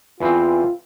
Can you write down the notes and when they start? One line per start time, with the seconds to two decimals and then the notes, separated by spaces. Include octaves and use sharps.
0.20 E2 E3 C4 F4